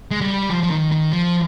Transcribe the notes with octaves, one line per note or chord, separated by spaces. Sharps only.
G#3
G3
F3
F3
D#3
D#3
F3